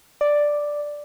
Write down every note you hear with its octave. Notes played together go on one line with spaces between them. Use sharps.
D5